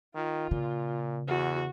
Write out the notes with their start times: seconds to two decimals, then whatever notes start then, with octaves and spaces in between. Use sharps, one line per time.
0.15 D#3 F4
0.51 A#2 C#3
1.28 E2 F#4